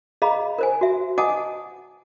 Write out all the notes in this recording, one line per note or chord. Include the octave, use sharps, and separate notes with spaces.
G#4 D#5 F5 A#5 B5
A#4 C5 G#5
F#4 E5
D#5 F#5 G#5 A5 D6 D#6